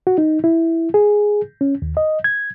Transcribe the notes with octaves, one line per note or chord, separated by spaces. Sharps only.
F#4
D#4
E4
G#4
C#4
D#2
D#5
G#6